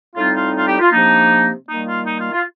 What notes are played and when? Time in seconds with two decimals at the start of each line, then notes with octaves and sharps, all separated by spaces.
0.15 A2 G3 C4 D#4 F4
0.35 F4
0.56 F4
0.67 G4
0.80 F4
0.92 C3 F3 A#3 D4 D#4
1.68 D#3 G3 A#3 D#4
1.87 F4
2.06 D#4
2.20 F4
2.32 F4